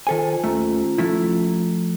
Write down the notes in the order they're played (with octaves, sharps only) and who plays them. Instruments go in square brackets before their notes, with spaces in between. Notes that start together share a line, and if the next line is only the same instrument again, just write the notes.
[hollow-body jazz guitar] D#3 A4 G#5 [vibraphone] F4 C5
[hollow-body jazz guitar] D#2 A3 [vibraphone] C#4 F4 A#5
[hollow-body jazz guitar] F3 A3 E4